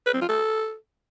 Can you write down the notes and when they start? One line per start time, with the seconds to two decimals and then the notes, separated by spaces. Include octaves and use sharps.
0.07 B4
0.14 C4
0.21 F4
0.29 A4